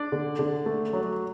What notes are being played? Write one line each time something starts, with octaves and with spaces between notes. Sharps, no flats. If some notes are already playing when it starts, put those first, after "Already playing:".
Already playing: D4 D5
D3
D3
A3
F#3